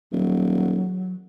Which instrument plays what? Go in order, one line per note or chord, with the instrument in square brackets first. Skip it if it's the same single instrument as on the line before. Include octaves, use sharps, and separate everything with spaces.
[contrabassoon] D#1 [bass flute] F#3